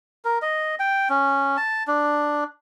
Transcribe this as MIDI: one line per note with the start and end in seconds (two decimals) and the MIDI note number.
0.25 0.38 70
0.42 0.75 75
0.79 1.08 79
1.10 1.57 61
1.57 1.83 81
1.87 2.44 62